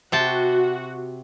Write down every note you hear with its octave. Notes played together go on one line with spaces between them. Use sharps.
C3 F#4 G5 A5